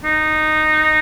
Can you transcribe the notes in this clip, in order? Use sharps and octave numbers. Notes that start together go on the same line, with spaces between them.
D#4